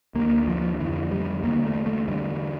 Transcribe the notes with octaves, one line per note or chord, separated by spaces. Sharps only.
D2 D3 A#3
F3
F2 D3 E3
G3
E2 D3 A#3
A3
A3
E2 D3 G3